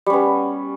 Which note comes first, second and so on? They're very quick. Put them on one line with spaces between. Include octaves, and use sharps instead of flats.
G3 C#4 B3